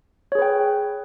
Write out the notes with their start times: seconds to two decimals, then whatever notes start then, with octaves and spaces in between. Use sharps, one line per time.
0.32 C#5
0.35 G#4
0.39 B4
0.42 G5